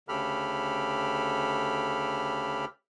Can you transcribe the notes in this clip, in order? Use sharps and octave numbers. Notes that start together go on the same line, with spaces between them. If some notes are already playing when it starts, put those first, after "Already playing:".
D2 C#3 G4 A4 B5 F6